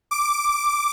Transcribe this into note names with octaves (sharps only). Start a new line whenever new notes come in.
D6